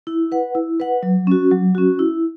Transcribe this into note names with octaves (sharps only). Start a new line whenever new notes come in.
E4
B4 F#5
E4
B4 F#5
F#3
C#4 F#4
F#3
C#4 F#4
E4